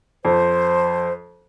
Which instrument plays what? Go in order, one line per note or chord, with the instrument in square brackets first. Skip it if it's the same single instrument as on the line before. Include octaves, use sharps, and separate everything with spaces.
[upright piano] F2 [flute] C5